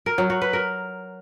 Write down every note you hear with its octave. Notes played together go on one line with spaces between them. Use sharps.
A#4
F#3
F#4
B4
A#4